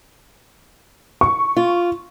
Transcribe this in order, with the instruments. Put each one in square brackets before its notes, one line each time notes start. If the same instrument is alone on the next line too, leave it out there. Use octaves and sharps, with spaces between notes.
[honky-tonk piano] C#6
[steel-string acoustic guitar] F4